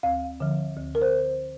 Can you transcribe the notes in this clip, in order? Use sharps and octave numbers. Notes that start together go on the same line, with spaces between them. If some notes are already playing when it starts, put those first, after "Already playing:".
D2 F5
D3 F3
D2
A#4
C5